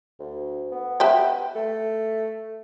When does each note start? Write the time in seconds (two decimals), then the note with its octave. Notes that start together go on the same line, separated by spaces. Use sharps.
0.19 D2
0.72 B3
1.00 B4 E5 G5
1.56 A3